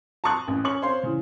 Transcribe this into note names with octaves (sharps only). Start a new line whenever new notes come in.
A5 A#5 C6 C#6 D#6 F#6
A1
C#4 C#6 F#7
C5 C#5 F5 C6
C#3 E3